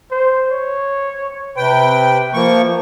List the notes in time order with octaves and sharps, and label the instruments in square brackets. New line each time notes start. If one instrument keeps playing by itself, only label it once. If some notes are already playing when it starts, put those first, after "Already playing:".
[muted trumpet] C5
C#5
[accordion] C3 G5 [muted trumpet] B4
[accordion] F3 A#3 C#6